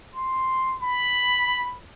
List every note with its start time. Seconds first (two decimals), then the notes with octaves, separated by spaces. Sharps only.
0.15 C6
0.82 B5